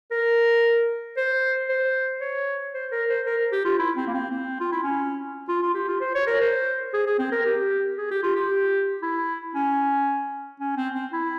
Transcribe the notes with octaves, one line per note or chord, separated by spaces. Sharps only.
A#4
C5
C5
C#5
C5
A#4
C5
A#4
G4
F4
E4
C4
A#3
C4
C4
F4
E4
C#4
F4
F4
G4
F4
C5
C#5
A#4
C5
G#4
G#4
C4
A#4
G4
G#4
G4
F4
G4
E4
C#4
C#4
C4
C4
E4